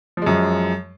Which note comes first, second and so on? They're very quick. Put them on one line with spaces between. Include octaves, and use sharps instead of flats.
F3 G#3 F#2